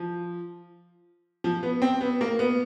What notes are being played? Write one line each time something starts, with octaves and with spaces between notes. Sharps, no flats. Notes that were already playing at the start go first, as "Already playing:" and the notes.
Already playing: F3
F3
B3
C4
B3
A#3
B3